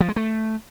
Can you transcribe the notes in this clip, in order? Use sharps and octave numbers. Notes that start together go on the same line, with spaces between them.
F3
G#3
A3